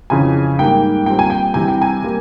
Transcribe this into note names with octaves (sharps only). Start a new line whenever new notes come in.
F2 C#3 E3 G#5
G#2 G3 A#3 G5
A#2 G3 C4 G5
G#5
G5
C3 E3 G3 G#5
G5
G#5
G3 A#3